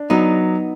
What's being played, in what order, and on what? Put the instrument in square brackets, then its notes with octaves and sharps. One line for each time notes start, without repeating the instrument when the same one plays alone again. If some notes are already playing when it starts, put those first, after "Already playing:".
Already playing: [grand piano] D4
[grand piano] F#3 [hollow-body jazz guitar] B3 D#4